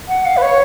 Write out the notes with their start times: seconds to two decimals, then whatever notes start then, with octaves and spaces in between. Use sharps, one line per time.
0.08 F#5
0.26 F5
0.37 B4
0.42 C#5